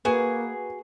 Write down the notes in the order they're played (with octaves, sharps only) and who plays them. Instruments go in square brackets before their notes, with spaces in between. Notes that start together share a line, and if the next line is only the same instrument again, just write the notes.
[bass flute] A#3 [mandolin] F#4 G#4 [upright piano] B4 [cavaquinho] G#5